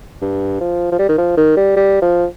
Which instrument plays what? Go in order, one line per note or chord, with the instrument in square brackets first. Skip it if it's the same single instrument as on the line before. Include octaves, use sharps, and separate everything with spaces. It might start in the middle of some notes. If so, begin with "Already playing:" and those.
[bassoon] G2
F3
F3
G3
D#3
F3
D#3
G3
G3
F3